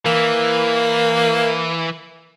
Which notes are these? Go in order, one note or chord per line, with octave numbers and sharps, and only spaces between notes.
E3 A#3